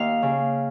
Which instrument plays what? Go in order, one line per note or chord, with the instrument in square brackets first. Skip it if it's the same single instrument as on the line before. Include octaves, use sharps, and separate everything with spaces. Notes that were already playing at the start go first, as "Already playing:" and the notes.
Already playing: [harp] D#2 F5
C#3